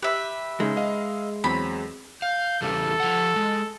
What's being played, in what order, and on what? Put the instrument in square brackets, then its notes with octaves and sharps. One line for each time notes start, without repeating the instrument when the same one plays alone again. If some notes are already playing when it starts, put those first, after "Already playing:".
[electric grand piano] G4 [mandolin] B4 E5
[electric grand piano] C#3 D#4 [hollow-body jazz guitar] G#3
[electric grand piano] D#5 F5
[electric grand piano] E2 F#3 C4 [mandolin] B5
[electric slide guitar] F5 [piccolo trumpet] G6
[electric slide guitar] E2 C#3 G3 [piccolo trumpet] A4
[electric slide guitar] F3 F#5
G#3